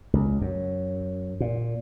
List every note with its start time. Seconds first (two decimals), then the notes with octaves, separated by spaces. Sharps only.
0.13 C#2
0.41 F#2
1.40 A#2